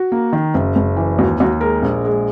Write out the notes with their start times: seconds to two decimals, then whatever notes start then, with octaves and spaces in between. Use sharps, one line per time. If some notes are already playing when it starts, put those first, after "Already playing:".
Already playing: F#4
0.12 A#3
0.33 D#3
0.54 F#1
0.76 F#1
0.97 E3
1.19 D#2 F#4
1.40 D#2 F#4
1.61 G#3 A#4
1.83 A#1
2.05 G#3